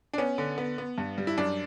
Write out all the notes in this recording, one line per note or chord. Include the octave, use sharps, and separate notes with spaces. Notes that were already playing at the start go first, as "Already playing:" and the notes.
D4
B3 C#4
D3
B3
B3
G2
G3
E4
F#2 D4